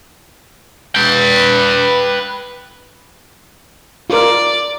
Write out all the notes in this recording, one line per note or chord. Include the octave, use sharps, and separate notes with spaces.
B4 G5
F4 A#4 D5